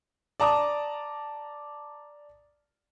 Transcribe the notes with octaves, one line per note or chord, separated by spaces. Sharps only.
D5 A5 A#5 D6 D#6